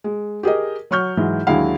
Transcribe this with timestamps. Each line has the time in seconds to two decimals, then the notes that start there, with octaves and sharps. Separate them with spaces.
0.04 G#3
0.43 G4 G#4 A#4 D#5
0.91 F#3 C#5 C#6 F6 G6
1.17 G#2 E3 F#3
1.47 D#2 D3 F#3 G#3 E4 F5